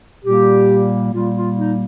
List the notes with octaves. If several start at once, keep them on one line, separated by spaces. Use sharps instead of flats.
A#2 G3 A#3 G4
A#2 G3 A#3 F4
F4
D#4